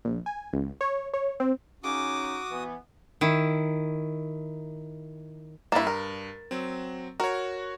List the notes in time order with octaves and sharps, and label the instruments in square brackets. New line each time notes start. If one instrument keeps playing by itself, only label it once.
[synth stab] A#1
G#5
C#2
C#5
C#5
C4
[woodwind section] C#3 C#4 D#4 [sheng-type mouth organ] F#4 D#6 [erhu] D6
[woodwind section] E3 B3
[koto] D#3 E4
[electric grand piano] G2 A6 E7 [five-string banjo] A#3 E4
[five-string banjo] A#4
[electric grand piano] F#3 C4
[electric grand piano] F#4 C#5 [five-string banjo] A#4